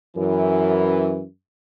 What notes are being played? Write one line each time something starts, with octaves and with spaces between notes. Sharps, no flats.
F#2 E3